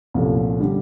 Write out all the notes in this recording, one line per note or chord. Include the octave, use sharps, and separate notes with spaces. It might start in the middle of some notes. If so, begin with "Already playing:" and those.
C2 A#2 F3 A3 C#4
D3 G3